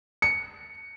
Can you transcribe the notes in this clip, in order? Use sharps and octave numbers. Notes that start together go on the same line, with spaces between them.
C#7